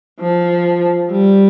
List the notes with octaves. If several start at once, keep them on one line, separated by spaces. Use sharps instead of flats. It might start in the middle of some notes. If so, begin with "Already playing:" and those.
F3
G3